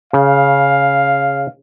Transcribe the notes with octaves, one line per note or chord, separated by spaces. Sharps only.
C#3 F5